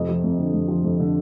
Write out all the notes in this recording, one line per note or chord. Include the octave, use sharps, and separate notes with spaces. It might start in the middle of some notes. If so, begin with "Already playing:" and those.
Already playing: F2 C3 D#5
F3
F2
D3
F2
F3
F2
D3